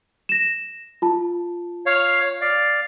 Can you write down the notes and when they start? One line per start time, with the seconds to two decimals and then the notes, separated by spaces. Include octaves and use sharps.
0.29 A#6 E7
1.02 F4 A5
1.86 C#5 F5
2.41 D5 F5